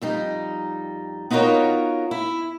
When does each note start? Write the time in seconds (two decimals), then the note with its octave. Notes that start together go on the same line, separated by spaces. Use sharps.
0.02 F2 G3 D#4
1.30 B3 D#4 F4 F#4 A#4 C#5
2.11 E4